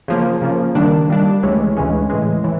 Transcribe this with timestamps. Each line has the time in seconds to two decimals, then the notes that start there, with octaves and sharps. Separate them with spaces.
0.08 C#3 F3 A#3
0.42 C#3 F3 A#3
0.75 D#3 G3 A#3 D4
1.09 D#3 G3 A#3 D4
1.43 D2 C#3 E3 G#3 C#4
1.77 D2 C#3 E3 G#3 C#4
2.10 A2 E3 G#3
2.44 A2 E3